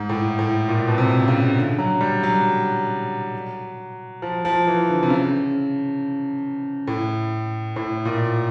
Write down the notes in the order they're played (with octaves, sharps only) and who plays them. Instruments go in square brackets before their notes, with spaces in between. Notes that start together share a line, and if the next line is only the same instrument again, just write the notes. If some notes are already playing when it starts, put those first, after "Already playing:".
Already playing: [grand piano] G#2
A2
A2
A#2
B2
C3
C#3
D3
F#3
G3
F#3
F3
F3
E3
D3
C3
C#3
A2
A2
A#2